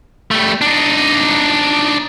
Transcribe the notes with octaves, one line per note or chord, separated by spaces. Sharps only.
G3 A3
D4 D#4